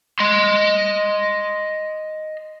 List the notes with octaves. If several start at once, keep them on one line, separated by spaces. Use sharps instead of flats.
D#5 C6